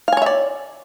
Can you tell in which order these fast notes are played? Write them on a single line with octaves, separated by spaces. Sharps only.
F5 G#5 C#5 E5 D5